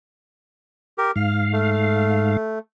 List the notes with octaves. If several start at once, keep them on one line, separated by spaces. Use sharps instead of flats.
G4 A#4
G#2 F5 F6
A3